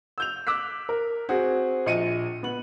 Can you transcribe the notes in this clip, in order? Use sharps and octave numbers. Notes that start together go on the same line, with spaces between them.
E6 G6 F7
D6 E6 F#6 B6
A#4
C4 F#4 G#4
A#1 D#5 C#7 D#7
B3 F#7